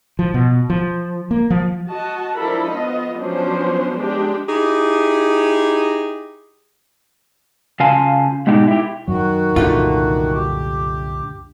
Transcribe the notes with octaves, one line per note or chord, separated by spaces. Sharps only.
F3
B2
F3
A#3
F3
F#4 D#5 A5
F3 D4 E4 A4 A#4 B5
B3 F4 D#5
F3 F#3 B3 C#4 D4 C5
G#3 D4 G4
D#4 E4 G4 G#4
C#3 F4 F5 G#5 A5
G#2 B2 D#4 G4
E4 G4
F#2 D#3 F#3 F#4
C2 F#2 A#2 D3 A3 F4
G4